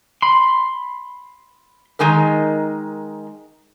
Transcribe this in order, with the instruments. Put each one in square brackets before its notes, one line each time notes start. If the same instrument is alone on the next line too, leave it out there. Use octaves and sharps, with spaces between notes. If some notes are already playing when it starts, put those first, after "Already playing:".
[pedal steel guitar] B5 C6
[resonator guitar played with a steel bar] D#3 G#3 D#4 A#4